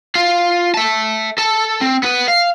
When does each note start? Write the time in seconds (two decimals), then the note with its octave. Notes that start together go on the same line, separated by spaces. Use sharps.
0.15 F4 F5
0.74 E5 A5
1.38 A4 A5
1.81 C4
2.03 B3 B4
2.28 F5